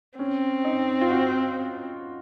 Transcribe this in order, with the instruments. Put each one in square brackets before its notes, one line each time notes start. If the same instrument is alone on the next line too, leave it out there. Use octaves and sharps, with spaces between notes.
[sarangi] C4 [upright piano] C#4
[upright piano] D#4
F4
F#4